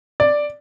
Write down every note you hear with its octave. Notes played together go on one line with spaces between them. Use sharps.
D5